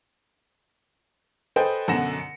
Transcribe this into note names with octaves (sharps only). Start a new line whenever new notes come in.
A4 B4 C5 D#5 G5 G#5
F#2 B2 D3 F#5 A#6 E7
C#7